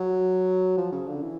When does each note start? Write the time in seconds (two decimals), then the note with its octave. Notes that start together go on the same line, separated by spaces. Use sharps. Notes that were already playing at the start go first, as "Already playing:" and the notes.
Already playing: F#3
0.77 F3
0.92 C#3
1.08 D3
1.22 E3